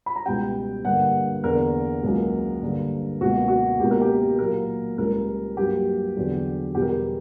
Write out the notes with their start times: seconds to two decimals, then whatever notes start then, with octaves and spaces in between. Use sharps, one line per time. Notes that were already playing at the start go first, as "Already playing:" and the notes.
0.06 B5
0.16 A#5
0.26 C#2 B2 G3 G5
0.85 G2 D3 A#3 F#5
1.43 E2 D3 A#3 A#4
2.03 C#2 C#3 F#3 A#3
2.61 G2 D3 A#3
3.21 C#2 B2 A#3 F#4
3.48 F#4
3.80 C#2 B2 A#3 G4
3.91 A#4
4.01 G4
4.39 A#2 F#3 A#3 A#4
4.98 C#2 C#3 G3 A#4
5.57 G2 F#3 A#3 G4
6.16 E2 D3 F#3
6.75 E2 B2 G3 G4
6.82 A#4
6.89 G4